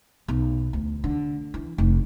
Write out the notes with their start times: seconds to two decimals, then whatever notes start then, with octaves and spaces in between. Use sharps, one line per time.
0.28 B1
0.73 D2
1.04 D3
1.54 E3
1.78 F1